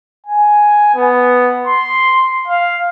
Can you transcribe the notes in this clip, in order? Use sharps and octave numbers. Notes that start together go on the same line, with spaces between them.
G#5
B3
C6
F5